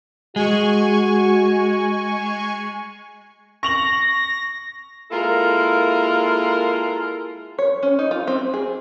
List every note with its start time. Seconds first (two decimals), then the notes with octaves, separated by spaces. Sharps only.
0.36 G#3 F#4 G#5 C#6
3.63 C#6 A#6 F7 F#7
5.11 G#3 A#3 E4 F4 A4 A#4
7.59 C#5
7.83 C#4
7.99 D#4
8.11 F4
8.27 C4
8.54 G#4